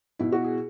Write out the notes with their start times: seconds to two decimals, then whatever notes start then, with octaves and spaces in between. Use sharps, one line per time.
0.19 B2 E4
0.32 F#4
0.44 G#4